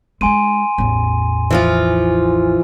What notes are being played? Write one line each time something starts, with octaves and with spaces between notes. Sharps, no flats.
G#3 D#4 G#5 C6 D#7
A1 E2
E3 F3 F4